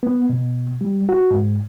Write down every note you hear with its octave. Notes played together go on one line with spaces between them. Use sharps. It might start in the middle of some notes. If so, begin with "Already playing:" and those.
B3
B2
G3
F#4
G#2